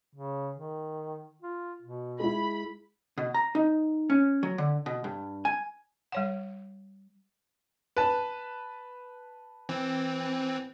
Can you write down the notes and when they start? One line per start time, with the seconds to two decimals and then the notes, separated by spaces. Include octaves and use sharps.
0.16 C#3
0.56 D#3
1.43 F4
1.82 B2
2.20 G#3 E4 B5
3.18 B2
3.34 A#5
3.55 D#4
4.10 C#4
4.43 F#3
4.58 D3
4.86 B2
5.04 G2
5.45 G#5
6.12 G3 C#5 F#5
7.97 B4 A5
9.69 E3 C4